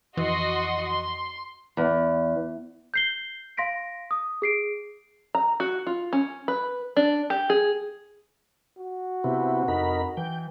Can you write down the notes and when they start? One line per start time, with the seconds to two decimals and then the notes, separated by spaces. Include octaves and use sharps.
0.17 F2 E3 F#4 D#5 C6
0.86 C6
1.77 E2
2.94 G6 C7 G7
3.57 F5 C6 A#6 B6 D7
4.11 D#6
4.42 G#4 C7 D7
5.35 A#5
5.60 F#4
5.87 F4
6.13 C#4
6.48 B4
6.97 D4
7.30 G4
7.50 G#4
8.78 F#4
9.24 C3 B3 C4 E4
9.68 F2 D#4 A#4 B5
10.17 E3 G5